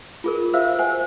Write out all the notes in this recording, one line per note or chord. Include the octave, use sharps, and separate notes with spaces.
F4 G#4 A#4
F#4 C5 E5 F5 E6
C5 F#5 G#5